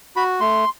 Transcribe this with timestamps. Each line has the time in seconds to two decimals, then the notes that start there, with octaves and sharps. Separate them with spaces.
0.16 F#4 B5
0.40 A3 C6